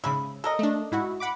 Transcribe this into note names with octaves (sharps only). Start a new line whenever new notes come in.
G#2 C#3 E5 B5
A4 A#4 D#5
A3 D4
G#2 E4 F#4
F#5 B5 D6